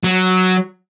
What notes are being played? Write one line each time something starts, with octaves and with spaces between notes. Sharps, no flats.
F#3